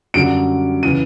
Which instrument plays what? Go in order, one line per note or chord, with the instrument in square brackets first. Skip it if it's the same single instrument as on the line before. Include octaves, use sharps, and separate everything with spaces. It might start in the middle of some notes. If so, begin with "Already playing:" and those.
[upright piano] F#2 D3 G3 D7
C#3 E3 D#7